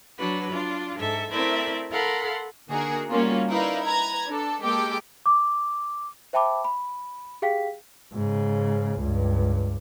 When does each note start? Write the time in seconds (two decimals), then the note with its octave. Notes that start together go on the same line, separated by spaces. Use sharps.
0.18 F#3 D4 F#4 B4
0.49 D4 F4
0.97 G#2 A4 E5
1.31 A3 C4 E4 A#4 D5 E5
1.90 A4 A#4 F5 F#5 B5 C6
2.68 D3 A#3 D#4 F#4 G#4 A#4
3.10 G3 A#3 C#4 F4 F#4
3.49 D#4 E4 A#4 B4 D5 F5
3.84 B4 A#5 G#6
4.26 D4 A4
4.62 G#3 A#3 G4 A4 G5 D6
5.26 D6
6.33 C5 E5 G5 A5 B5 D6
6.64 B5
7.42 G4 G#4 F5 G5 B6
8.13 G#2 C#3
8.99 C#2 G2